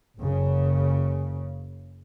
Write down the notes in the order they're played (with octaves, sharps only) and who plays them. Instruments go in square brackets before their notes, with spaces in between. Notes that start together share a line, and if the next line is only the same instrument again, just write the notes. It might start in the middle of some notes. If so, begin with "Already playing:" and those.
[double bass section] F#1 C#3